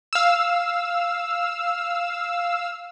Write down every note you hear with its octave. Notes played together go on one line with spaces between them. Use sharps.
F5 E6